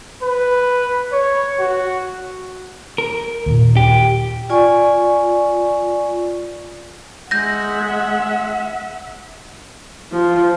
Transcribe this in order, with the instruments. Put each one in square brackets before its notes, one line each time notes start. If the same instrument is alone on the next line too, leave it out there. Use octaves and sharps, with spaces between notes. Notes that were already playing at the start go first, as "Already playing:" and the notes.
[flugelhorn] B4
C#5
F#4
[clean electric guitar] A#4
[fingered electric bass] D#2 A#2
[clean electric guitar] G4
[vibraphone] F4 D5 G#5 C#6
[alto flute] G#3 [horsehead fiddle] E5 F#5 [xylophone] G6 A#6
[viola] F3